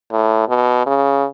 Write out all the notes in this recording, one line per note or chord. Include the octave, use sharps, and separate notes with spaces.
A2
B2
C#3